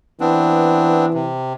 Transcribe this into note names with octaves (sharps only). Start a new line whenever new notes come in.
E3 B3 C4 D4
C3